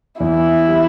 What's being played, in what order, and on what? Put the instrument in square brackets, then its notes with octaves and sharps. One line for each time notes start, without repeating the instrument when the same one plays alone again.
[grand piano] E2 [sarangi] E4
[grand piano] G3